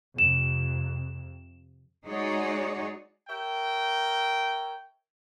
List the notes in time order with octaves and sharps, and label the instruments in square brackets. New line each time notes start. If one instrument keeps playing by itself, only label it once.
[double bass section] F2 C3 [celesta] E7
[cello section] G#3 D#4 F#4 G#4 C#5 D5
[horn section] A#4 C#5 E5 G5